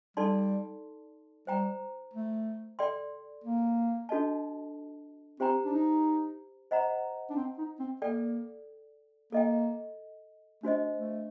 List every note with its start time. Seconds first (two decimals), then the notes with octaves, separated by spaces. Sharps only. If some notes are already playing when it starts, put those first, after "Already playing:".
0.17 G3 D#4 A4 D5 A5 C6
1.47 G3 C5 G5 A#5
2.13 A3
2.79 A4 D5 G5 C6
3.44 A#3
4.09 D4 F#4 A4 D#5 A5
5.40 C4 G4 C5 G5 A#5
5.65 D4
5.73 D#4
6.71 C5 D#5 F#5 A#5
7.30 D4
7.36 C4
7.58 D#4
7.80 C4
8.01 A#3 A4 D5 G5
9.32 A#3 A4 D#5 G5
10.63 A3 D4 F#4 C5 D#5
10.96 A3